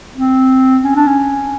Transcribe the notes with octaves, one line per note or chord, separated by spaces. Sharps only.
C4
C#4
D4
C#4